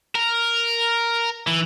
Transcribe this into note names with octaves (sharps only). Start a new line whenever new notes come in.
A#4
E3